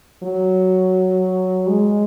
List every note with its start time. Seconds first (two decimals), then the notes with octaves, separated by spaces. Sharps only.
0.23 F#3
1.69 G#3